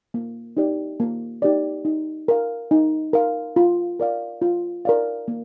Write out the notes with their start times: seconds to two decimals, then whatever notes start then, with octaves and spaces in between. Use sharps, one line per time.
0.14 A#3
0.57 D#4 G4 D5
1.00 A#3
1.42 D#4 G4 D5
1.85 D#4
2.28 A#4 F5
2.71 D#4
3.13 A#4 F5
3.56 F4
4.00 A#4 D5 F5
4.42 F4
4.85 A#4 D5 F5
5.28 A#3